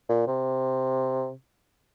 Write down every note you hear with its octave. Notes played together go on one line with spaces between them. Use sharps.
A#2
C3